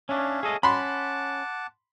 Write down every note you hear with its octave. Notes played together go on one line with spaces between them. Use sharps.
C#4 D4 C#5 E5 F5
G#4 A4 D#5
C#4 F#5 A5 B5 C6 D6